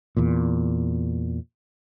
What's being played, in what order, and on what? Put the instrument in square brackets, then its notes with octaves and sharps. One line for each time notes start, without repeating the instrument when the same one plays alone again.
[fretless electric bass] E2 A#2